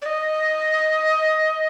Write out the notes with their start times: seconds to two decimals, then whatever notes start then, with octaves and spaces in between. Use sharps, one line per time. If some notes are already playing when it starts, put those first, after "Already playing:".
0.02 D5
0.06 D#5